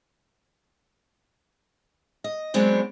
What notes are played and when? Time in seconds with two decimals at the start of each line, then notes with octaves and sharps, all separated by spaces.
2.24 D#5
2.54 F#3 G#3 B3 C4 D4